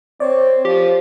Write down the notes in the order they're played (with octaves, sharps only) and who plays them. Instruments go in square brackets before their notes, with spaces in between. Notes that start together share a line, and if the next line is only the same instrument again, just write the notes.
[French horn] C4 [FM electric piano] C#5 D5
[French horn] F3 [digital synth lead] G4